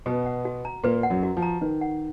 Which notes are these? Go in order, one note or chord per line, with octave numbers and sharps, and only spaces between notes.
B2 B3 B4
F#5
F#4
A#5
A#2 A#3 B4
F#5
F#2 F#3
F#4
F3
A#5
D#3 B4
F#5